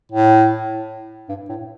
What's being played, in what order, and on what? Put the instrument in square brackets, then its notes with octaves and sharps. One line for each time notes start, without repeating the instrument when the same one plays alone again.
[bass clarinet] A2
G2
A2